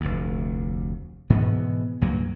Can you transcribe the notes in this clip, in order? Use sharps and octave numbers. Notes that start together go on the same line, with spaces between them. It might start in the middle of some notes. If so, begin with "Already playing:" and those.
F1 D2
G#2 B2 E3 B3
C#2 G2 F#3 A#3